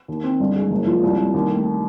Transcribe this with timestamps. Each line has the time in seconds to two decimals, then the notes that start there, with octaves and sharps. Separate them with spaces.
0.08 D#2
0.24 C4
0.40 G1
0.56 G#3
0.71 F#1
0.87 F3
1.03 C2
1.18 C2
1.34 D#2
1.50 A3